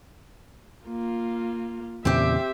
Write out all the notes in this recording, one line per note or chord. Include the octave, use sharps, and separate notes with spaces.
A#3 F4
E2 A#2 C#3 C4 G4 E5